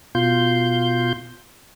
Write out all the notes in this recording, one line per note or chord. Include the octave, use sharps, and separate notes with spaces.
B2 F4 C6 G6